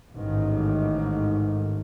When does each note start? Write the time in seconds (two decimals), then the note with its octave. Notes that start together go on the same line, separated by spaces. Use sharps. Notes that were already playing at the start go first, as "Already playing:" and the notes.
0.15 A1 G#2 D#3